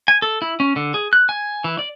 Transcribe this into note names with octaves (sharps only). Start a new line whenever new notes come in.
G#5
A4
E4
C#4
D3
G#4
F#6
G#5
E3
D5